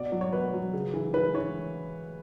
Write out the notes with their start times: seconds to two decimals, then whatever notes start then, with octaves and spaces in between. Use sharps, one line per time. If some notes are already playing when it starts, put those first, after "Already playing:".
Already playing: B2 D5
0.12 F#3
0.21 C#5
0.32 B2 B4
0.53 F#3
0.73 C#3
0.93 E3
1.13 E3 B4
1.34 E3 C#5